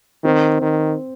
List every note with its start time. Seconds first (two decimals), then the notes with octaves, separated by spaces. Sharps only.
0.24 D#3 C4
0.62 D#3